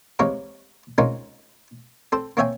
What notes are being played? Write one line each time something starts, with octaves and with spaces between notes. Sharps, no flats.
C3 E3 G#3 C#5 F5 A#5
G#3 C4 C#4 D#4 F4 A#4
C4 A4 C5
A#3 C4 C#5 E5 G5 G#5